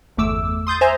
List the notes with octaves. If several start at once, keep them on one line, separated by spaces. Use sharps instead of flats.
G1 E2 A3 D6 E6
C6 D#6 G6 A6
C5 E5 G#5 A#5 C6